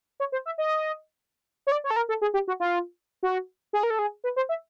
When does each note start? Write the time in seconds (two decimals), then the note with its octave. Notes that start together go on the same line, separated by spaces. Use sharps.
0.20 C#5
0.32 C5
0.46 E5
0.58 D#5
1.67 C#5
1.72 D5
1.84 C#5
1.91 A4
1.96 A#4
2.09 A4
2.22 G#4
2.34 G4
2.48 F#4
2.60 F4
3.23 F#4
3.73 G#4
3.83 A#4
3.90 A4
3.99 G#4
4.24 B4
4.36 C5
4.49 E5